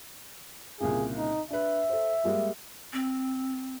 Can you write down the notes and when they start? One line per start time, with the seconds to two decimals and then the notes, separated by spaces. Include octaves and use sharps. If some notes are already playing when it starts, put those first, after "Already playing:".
0.80 C2 A#2 C#3 G#4
1.17 D#4
1.50 D4 B4 E5
1.89 A4 C5
2.24 G3 G#3 A#3
2.93 C4